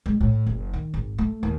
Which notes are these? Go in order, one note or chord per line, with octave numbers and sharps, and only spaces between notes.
G#3
A2
F#1
D#3
G#1
A3
D#2